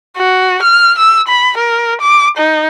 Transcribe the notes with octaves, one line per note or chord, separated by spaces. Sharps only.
F#4
F6
E6
B5
A#4
D6
D#4